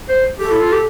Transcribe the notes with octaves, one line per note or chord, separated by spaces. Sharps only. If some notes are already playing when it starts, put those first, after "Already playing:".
C5
G4 A4
E4
F4
G4